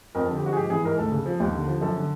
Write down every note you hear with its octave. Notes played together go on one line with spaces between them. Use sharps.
F2 A#4
A4
D3
G4
F3 F#4
G#4
G#2 G4
E3 G#4
G#2 A#4
D2 A4
C#3
F3
D#2
D3
F3
F#2 A4
D3